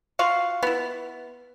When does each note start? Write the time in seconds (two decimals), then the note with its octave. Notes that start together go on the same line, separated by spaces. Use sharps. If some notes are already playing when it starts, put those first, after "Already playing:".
0.19 F4 F#4 F5
0.63 B3 E4